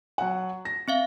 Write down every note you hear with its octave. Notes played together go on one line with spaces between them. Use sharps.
F#3 F#5
A#6
C4 E5 F5